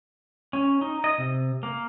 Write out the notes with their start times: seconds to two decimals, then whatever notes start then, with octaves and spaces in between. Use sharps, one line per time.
0.53 C#4
0.81 D#4
1.04 D#5
1.18 C3
1.63 A#3